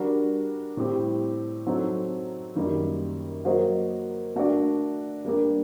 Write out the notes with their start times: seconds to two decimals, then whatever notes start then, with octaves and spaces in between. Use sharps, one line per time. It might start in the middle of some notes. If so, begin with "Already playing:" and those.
Already playing: G3 D4 F#4 A#4
0.77 A2 G3 C4 G4
1.66 F#3 C4 D#4 A4
2.55 F#2 D#3 G3 A#3
3.45 F#3 A#3 F#4 C5 D#5
4.36 A3 D4 F#4 A#4 D5
5.25 G3 A#3 D4 G4